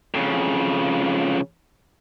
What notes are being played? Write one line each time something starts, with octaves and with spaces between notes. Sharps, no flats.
F2 C#3